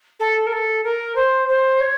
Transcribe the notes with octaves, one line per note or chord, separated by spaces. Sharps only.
A4
A#4
A4
A#4
C5
C5
C#5